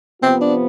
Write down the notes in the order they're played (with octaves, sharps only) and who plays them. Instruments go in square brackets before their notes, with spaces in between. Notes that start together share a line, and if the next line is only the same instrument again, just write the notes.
[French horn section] C3 F3 B3 F4 [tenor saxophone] C4
[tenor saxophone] D4